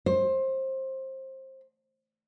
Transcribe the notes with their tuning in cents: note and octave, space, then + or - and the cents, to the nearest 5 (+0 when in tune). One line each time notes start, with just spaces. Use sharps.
C5 +20